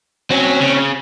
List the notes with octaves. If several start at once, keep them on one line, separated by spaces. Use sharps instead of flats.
F#3 C4 C#4
C#3